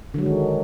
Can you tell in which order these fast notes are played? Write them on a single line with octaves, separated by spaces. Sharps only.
D3 F#3 G#3 D#3